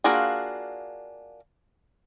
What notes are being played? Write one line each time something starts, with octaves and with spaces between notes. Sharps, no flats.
A#3 D4 F4 F#4 G#4